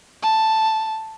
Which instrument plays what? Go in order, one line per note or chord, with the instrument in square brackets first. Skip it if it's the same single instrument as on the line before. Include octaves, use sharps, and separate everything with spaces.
[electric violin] A5